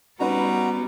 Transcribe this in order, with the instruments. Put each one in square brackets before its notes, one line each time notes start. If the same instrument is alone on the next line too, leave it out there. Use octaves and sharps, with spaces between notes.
[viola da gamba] G3 B3 [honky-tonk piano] C#4 D#4 B4 [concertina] F#4 A#5